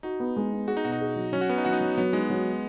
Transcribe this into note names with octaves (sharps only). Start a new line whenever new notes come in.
D#4 F#4
B3
G#3
B3
F#4 G#4
D#4
B2 F#4
D#4
G#4
F#3
F#3 C#4
F#4
B3 B4
D#4
F#3 F#4
D#4
F#3
F#3 B3
G#3 D#4
F#3